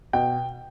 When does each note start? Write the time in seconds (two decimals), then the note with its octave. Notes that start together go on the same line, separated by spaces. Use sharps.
0.13 B2 G5